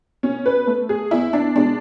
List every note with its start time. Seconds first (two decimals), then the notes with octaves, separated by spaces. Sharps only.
0.23 B2 C#4
0.46 B4
0.67 A3
0.89 G#4
1.11 E2 E4
1.33 D4
1.56 B2 G#3 D4